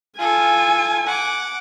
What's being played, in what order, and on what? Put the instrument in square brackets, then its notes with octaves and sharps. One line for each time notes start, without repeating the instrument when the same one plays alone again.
[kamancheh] F4 A4 [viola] G#5
[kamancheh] F#5 D6